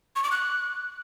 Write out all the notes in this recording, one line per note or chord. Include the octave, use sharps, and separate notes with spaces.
C#6
D6
F#6